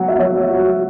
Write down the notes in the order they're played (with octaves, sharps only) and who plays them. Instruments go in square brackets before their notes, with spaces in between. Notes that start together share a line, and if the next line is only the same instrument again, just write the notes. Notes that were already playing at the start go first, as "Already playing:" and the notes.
Already playing: [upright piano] F#3 B3 [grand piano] F#5
[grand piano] E5
[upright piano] F#3 [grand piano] C#5
[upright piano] F#4